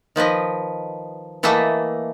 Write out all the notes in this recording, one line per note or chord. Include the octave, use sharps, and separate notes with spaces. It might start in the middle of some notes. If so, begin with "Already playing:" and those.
D#3 F3 B4 D#5
E3 A3 A#3 D#5 E5 A5